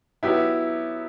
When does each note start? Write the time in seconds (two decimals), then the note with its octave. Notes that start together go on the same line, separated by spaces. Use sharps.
0.23 F#3 B3 E4 G4